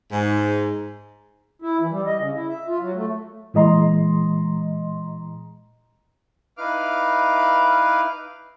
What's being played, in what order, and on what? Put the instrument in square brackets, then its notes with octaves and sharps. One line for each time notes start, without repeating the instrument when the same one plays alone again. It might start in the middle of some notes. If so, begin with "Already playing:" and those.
[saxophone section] G#2
[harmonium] E4
E3
G3
D#5
C#3
E4
E5
F4
F#3
A3
[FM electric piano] A#2 E3 G#3 D#5 A#5 C6
[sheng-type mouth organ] D#4 E4 B4 F5 D6 F6